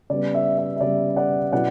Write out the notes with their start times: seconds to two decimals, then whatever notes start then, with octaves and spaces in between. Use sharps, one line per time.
0.10 C#3 G3 B3 D5
0.34 E5
0.58 E5
0.76 E5
0.81 C#3 G3 B3 D5
1.16 D5 F#5
1.52 B2 F#3 C#4 E4 D5 F#5